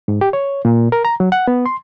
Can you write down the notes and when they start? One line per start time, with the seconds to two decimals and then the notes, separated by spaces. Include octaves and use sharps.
0.08 G#2
0.21 G4
0.33 C#5
0.65 A#2
0.92 A#4
1.05 A#5
1.20 F#3
1.32 F#5
1.48 B3
1.66 C6